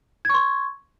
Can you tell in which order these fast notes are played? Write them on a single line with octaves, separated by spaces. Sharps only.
G#6 C#6 C6